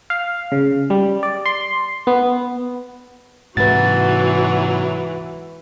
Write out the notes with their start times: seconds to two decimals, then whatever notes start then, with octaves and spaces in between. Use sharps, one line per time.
0.10 F5
0.52 C#3
0.90 G3
1.23 D5
1.46 C6
2.07 B3
3.57 G#2 C3 E3 F#3 F#4 B4 A6